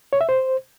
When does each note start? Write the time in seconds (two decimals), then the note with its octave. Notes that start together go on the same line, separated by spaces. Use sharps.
0.13 C#5
0.21 E5
0.29 C5